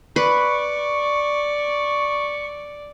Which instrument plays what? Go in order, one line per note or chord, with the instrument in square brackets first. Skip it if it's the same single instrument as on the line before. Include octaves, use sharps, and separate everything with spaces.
[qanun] B4 [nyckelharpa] D5 [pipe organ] C#6